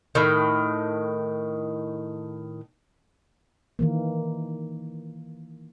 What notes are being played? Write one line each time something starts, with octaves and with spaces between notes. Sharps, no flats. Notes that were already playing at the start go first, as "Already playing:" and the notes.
A2 D#3
D#3 E3 A#3